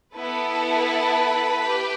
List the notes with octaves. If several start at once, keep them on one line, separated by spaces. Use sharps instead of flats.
B3 E4 A4 B4
G4